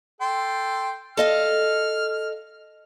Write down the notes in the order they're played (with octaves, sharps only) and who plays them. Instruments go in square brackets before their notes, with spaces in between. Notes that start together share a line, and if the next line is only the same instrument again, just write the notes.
[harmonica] A4 G5 C6
[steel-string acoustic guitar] A4 D#5 F5 [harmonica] F6